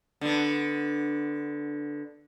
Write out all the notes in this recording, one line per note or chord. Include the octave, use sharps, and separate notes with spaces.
D3 B3